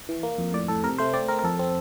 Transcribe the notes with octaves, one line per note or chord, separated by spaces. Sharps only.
E3
A#3
F2
A2 D5
A2 A4
C3 A#4
A3 C5
C4 D5
C4 A#4
A#4
F2 A4
C4